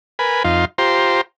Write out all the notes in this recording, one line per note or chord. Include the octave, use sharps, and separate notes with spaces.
A#4 B4 G#5 B5
F2 D#4 F4 F5 C6
F4 G4 C5 A#5 C6